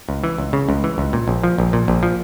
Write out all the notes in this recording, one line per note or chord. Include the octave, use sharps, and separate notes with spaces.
C#2
E3
C#2
C#3
C#2
E3
C#2
A#2
A#1
F3
A#1
A#2
A#1
F3